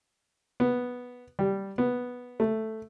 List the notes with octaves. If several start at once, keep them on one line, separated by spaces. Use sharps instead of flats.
B3
G3
B3
A3